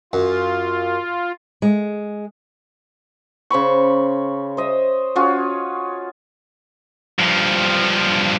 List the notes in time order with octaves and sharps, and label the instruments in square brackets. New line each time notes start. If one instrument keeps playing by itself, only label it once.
[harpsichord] F#2 [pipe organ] F4
[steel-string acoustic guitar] G#3
[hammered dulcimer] C#3 C5 B5 C#6
C5 D#5 E5
C#4 F4 F#4 G#4
[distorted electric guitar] G2 F3